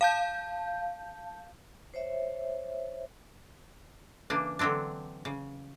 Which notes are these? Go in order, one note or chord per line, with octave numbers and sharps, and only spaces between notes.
F5 A5 G6
C5 C#5 E5
C#3 E3 A#3 D4
D3 E3 F#3 C4 D4
C#3